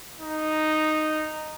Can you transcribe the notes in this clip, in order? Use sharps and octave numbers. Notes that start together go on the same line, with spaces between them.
D#4